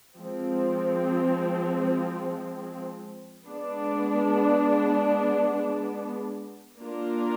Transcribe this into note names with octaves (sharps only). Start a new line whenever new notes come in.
F3 G#3 C4
G#3 B3 D4
A#3 D4 F4 A#4